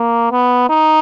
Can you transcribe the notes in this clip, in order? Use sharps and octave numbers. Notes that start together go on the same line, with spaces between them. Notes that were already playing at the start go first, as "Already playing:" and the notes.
Already playing: A#3
B3
D#4